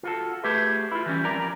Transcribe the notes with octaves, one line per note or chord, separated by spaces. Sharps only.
F4 F#4 A4
A3 G4 G#4 B4 E5
E4 F4
E3 G3 C#4
F2 A#4 D5 A#5